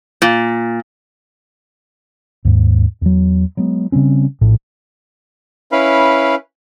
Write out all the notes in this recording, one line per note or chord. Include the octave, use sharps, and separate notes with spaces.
A#2
D#2 G#2
E2 F#3
F#3 G#3 B3
C#3 G3 C4 C#4
A#1 A2
C#4 E4 B4 F5 B5